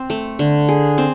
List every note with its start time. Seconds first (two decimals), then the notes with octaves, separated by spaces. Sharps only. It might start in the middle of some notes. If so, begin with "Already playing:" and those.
Already playing: C4
0.10 A3
0.39 D3
0.69 G#4
0.98 C4